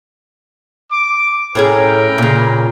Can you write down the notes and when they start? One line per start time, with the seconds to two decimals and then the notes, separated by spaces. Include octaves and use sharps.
0.91 D6
1.55 A2 C#4 G#4 A#4 B4 G5
2.18 A#2 C#3